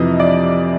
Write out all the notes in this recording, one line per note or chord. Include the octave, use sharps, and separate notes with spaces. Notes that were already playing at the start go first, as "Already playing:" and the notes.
Already playing: F2 C3 E3 D#5
D5